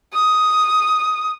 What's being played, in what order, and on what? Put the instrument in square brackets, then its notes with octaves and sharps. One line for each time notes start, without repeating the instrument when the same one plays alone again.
[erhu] D#6